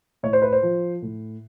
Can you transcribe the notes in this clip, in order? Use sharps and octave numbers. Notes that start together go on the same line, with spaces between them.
A2 C#5
C5
B4
C5
F3
A2